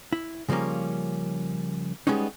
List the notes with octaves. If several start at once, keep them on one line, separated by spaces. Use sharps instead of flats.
E4
C#3 F3 G3 A#3 C#4
G3 G#3 B3 C#4 D#4